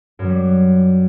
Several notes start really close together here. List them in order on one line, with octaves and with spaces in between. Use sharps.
F#2 F#3 G3